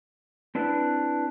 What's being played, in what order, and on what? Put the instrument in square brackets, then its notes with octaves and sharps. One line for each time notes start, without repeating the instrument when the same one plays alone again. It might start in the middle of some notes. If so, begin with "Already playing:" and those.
[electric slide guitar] C4 D4 E4 B4